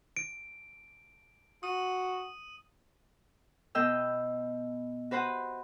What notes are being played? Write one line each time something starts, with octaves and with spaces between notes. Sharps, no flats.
D7
F#4 D#6 D#7
B2 B3 D#5 G5 E6
F#4 B4 C5 F#5